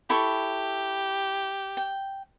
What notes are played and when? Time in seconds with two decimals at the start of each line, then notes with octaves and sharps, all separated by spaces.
0.10 E4 G4 A4 C#6
1.77 G5